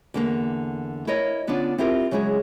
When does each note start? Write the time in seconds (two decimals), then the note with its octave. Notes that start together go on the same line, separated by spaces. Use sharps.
0.14 E2 D3 A#3
1.07 E4 A#4 C#5 D#5
1.47 D3 B3 C#4 D4 F4
1.78 C4 E4 F4 G4 A#4
2.11 C#3 F#3 G#3 E4 G#4